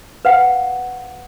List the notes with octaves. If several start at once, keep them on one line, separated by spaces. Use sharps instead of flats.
B4 F5 F#5